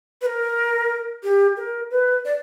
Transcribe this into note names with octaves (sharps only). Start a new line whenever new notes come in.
B4
A#4
G4
A#4
B4
D5